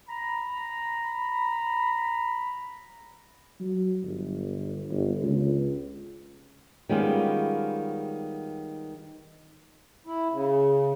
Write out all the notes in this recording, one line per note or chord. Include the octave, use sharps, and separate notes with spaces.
A#5 B5
F#3
G1
G1
C#2
D#3 G3 G#3 B3 C#4 F4
E4
C#3